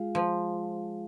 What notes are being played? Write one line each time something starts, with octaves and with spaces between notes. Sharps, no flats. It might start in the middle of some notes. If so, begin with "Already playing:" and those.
Already playing: G#3 F4 G#4 F5
F3